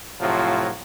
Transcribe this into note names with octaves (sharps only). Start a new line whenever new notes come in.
A2 C3 F3 F#3 F4